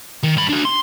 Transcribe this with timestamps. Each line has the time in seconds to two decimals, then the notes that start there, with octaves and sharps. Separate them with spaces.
0.23 D#3
0.37 G2 B5
0.49 D4 F#4
0.65 C6